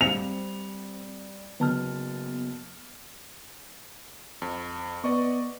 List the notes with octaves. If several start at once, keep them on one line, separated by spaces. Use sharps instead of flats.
G3 C4 C#7 F7
F#1 B3 A5 F6
F2
B3 D5 D#5 C#6